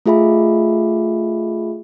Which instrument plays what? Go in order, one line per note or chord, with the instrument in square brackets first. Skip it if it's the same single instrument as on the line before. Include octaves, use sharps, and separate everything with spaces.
[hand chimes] A3 F4 G#4 E5 B5